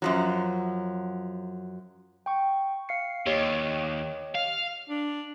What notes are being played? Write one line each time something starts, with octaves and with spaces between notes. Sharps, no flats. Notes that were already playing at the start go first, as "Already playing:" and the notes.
F#2 F3 F#3
G5 C#6
F5 C7 C#7
D#2 G4 C#5 D#5
F5
D4